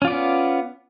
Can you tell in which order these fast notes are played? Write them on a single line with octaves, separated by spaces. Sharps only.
C#4 F4 D5 B3